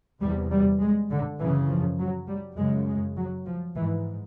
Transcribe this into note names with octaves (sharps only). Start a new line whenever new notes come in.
E2 C3 G3
G3
G#3
D3
F#2 C#3 E3
F3
F#3
G3
F#2 C#3 G#3
G#3
F#3
F3
G#2 E3